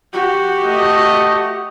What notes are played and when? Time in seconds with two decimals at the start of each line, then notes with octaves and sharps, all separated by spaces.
0.13 F#4 G4
0.64 A3 D#5